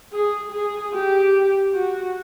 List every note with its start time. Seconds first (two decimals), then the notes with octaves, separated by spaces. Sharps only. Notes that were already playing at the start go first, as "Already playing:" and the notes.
0.12 G#4
0.52 G#4
0.93 G4
1.73 F#4